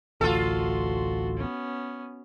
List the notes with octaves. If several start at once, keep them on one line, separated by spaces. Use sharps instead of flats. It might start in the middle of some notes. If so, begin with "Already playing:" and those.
A1 D2 F4 F#4 A4 C6
B3 C#4